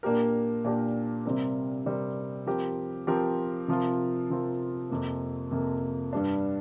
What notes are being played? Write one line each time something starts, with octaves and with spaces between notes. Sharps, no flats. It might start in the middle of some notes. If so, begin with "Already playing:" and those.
A#2 A#3 D4 G4 A#4
A#2 A#3 D4 G4 A#4
C3 G3 C4 A#4
C3 G3 C4 A#4
F3 C4 G4 A#4
F3 C4 G4 A#4
C3 F3 C4 F4 A#4
C3 F3 C4 F4 A#4
F2 C3 A#3
F2 C3 A#3
G2 G3 D4